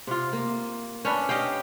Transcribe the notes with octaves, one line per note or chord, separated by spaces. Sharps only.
C3 F4
A#3
C#4 D4 B4
G4 D#5 F5 G5